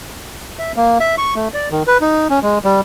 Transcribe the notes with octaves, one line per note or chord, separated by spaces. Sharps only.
E5
A#3
E5
C#6
A3
D5
D#3
B4
D#4
C#4
G#3
G3